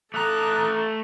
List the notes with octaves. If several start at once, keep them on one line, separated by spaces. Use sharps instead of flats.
A3 A4 A#5 D6 D#6 F#6